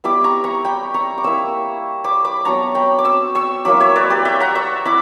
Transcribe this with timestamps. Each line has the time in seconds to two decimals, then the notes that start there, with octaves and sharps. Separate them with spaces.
0.04 G3 B3 E4 B5 D6
0.24 A#5 C#6
0.44 A#5 C#6
0.65 G5 B5
0.94 A#5 C#6
1.18 D6
1.24 A#3 E4 C#6 E6
2.04 B5 D6
2.24 B5 D6
2.45 F#3 B3 D4 A#5 C#6
2.75 G5 B5
2.99 D6
3.05 C#6 E6
3.35 C#6 E6
3.65 F#3 A#3 E4 B5 D6
3.80 C#5 E5
3.96 B4 D5
4.10 G4 B4
4.25 E5 G5
4.40 F#5 A#5
4.55 C#6 E6
4.85 E4 B5 D6